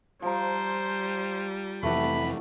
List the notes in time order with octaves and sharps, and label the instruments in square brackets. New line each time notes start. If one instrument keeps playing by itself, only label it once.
[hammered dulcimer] F3 A#5 [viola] G3 [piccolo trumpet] C5
[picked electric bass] F1 F2 E3 [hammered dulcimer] A3 G4 F#5 [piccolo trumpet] B5